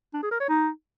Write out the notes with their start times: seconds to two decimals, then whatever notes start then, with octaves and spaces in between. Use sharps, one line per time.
0.14 D4
0.23 G#4
0.31 A#4
0.40 C#5
0.49 D#4